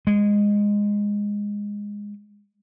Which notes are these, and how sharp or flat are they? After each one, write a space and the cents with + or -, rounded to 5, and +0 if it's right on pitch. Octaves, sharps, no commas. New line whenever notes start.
G#3 -15